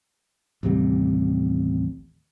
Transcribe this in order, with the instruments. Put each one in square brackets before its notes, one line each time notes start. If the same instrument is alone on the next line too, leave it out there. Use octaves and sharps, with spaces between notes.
[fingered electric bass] A1 D#2 C3 G3